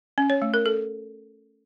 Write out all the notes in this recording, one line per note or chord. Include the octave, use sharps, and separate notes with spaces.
C#4
C#5
A3
A#4
A4